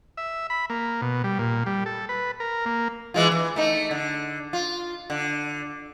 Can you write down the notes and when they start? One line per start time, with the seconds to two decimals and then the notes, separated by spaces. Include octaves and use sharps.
0.17 E5
0.50 B5
0.70 A#3
1.01 B2
1.24 G3
1.39 A#2
1.66 G3
1.86 A4
2.09 B4
2.40 A#4
2.66 A#3
3.14 E3 G#3 F4
3.31 E3
3.56 A3 D#4
3.91 D3
4.53 F4
5.10 D3